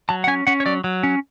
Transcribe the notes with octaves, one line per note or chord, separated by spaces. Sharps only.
F#3 A5
F#5
C#4 G#5
C#4 F#5
C#5
F#3 D5
F#3
C#4